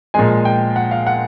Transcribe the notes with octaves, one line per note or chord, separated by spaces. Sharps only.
A#2 F3 G#3 G#5
G5
F#5
F5
F#5